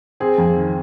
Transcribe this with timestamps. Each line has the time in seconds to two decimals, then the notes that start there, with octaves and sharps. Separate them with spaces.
0.20 C4 G#4
0.38 F2
0.57 D#3